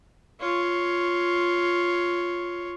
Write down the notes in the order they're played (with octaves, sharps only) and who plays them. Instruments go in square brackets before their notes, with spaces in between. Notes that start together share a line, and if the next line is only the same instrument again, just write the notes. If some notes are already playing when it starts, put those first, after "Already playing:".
[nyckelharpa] F4 C#5